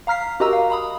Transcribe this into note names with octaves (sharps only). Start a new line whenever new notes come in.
F5 A#5 F6 B6 C7
F#4 G4 A#4 D#5 A#5 E6
F5
A#5 B5 D#6